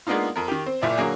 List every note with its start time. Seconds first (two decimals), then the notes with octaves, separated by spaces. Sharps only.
0.07 G#3 A#3 B3 D4 D#4 F4
0.36 F2 A#4
0.48 D#3 G4
0.66 C4
0.82 F#1 A#2 E4 D5
0.98 D3 F#3 A#3 G#4